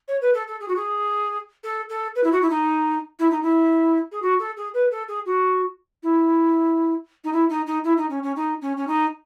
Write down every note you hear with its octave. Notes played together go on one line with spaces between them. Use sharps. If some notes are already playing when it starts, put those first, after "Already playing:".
C#5
B4
A4
A4
G#4
F#4
G#4
A4
A4
B4
E4
F#4
E4
D#4
E4
D#4
E4
G#4
F#4
A4
G#4
B4
A4
G#4
F#4
E4
D#4
E4
D#4
D#4
E4
D#4
C#4
C#4
D#4
C#4
C#4
D#4